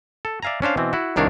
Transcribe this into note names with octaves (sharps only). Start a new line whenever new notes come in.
A4
D5 E5 F5 G#5 A#5
C#4 D4 C5 F5
B2 E3 C4
E4 F#4
C2 D#3 D4 A#4 C#5 F5